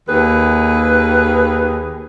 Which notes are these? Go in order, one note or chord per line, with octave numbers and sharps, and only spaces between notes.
D#2 G#4 B4